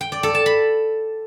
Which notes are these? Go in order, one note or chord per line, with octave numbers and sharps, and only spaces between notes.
G5
D5
A4
A5
B5